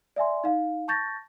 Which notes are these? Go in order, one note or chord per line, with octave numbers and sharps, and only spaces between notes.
D5 E5 G#5 C6
D#4 F5
A5 C#6 G6 A6 A#6